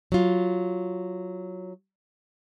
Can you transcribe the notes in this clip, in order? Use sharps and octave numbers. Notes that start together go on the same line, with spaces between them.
F#3 F4